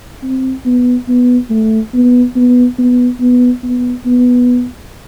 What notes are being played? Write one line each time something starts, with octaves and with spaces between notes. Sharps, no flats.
C4
B3
B3
A3
B3
B3
B3
B3
B3
B3